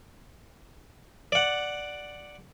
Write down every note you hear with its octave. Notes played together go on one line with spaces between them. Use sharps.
D5 F#5